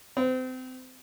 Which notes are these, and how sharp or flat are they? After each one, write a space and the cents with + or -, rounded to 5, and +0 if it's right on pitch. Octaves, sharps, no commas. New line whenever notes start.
C4 -30